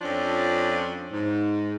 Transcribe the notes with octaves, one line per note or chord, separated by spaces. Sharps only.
F2 F3 C#4 D4
G#2